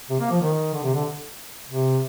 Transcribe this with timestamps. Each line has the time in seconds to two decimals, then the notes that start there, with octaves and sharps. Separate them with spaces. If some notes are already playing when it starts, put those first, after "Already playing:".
0.10 C3
0.20 A#3
0.31 F3
0.41 D#3
0.74 D3
0.84 C3
0.94 D3
1.69 C3